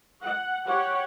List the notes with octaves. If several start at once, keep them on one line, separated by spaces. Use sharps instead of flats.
F#5
G4 C#5 F#5